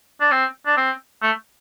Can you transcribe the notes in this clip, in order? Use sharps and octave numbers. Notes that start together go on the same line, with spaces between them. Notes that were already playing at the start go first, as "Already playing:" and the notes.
D4
C4
D4
C4
A3